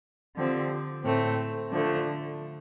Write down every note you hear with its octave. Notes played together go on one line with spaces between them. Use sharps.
D3 F3 C4 G4
A2 A3 C4
D3 F3 A3 D4